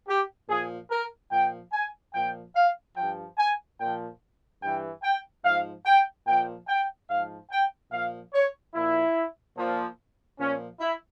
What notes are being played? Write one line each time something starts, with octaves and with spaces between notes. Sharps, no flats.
G4
A#2 F3 G#4
A#4
A#2 F3 G5
G#5
A#2 F3 G5
F5
G2 F3 G5
G#5
A#2 F3 G5
G2 E3 G5
G5
G#2 F3 F5
G5
A#2 F3 G5
G5
G#2 F3 F5
G5
A#2 F3 F5
C#5
A#2 F3 E4
A#2 F3
A#2 F3 C#4
E4